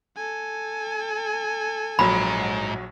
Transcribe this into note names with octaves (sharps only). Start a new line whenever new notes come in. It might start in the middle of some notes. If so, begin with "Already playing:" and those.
A4 G#5
A#1 G#2 F#3 B5